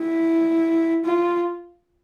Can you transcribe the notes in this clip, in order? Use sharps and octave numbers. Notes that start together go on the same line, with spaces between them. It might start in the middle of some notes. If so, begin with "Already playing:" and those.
Already playing: E4
F4